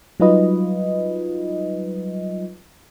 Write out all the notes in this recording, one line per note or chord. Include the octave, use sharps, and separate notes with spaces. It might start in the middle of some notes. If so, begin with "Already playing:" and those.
F#3 G3 D#4 F4 B4 D#5